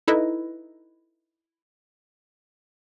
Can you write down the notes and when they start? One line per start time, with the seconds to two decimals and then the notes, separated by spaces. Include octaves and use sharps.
0.08 D#4 E4 A4 B4 D#5